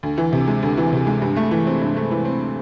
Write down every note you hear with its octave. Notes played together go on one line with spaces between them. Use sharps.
D2
E3
C3
G#3
D2
E3
C3
G#3
G2
A3
E3
C4
G2
A3
E3
C4